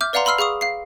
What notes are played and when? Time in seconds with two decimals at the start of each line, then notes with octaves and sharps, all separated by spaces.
0.01 E5 D6 F6 G6
0.13 B4 D5 F5 F#5 A#5 C6
0.25 F5 B5 C6 E6 F6 C7
0.38 G#4 F5 C#6 D#6
0.61 F5 C7